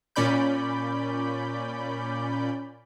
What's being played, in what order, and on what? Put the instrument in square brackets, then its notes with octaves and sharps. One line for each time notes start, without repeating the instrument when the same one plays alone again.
[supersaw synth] A#2 C#4 D5 B5 G6